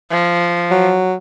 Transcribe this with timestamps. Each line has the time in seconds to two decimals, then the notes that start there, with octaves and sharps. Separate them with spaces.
0.11 F3
0.71 F#3